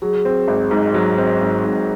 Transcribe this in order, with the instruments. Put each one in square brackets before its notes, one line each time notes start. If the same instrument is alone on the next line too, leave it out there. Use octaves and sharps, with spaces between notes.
[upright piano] F#3 [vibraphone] G#4
[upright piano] C4
G#1
G#2
F#3
C4
G#1
G#2